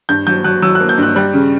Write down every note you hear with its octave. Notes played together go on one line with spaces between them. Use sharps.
G2 G6
F#3 G6
F#3 F#6
F#3 E6
F#6
A#3
G6
G2 F#6
G3 F#6
C#3